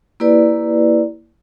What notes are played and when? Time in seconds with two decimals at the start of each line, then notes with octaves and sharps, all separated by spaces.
0.20 A#3 E4 G4 B4 D5